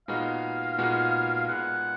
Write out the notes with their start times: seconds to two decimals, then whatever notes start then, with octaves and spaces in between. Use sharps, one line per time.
0.08 A#2 G#3 B3 D#4 F#4 F5
0.78 A#2 G#3 B3 D#4 F#4
1.48 A#2 G#3 B3 F#5